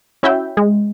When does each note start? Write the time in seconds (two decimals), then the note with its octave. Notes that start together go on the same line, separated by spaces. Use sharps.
0.23 C#4 E4 F#4 E5 G5
0.57 G#3